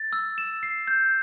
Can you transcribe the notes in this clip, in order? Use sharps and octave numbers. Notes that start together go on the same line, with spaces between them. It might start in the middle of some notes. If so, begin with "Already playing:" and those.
Already playing: A6
E6
E7
C7
G6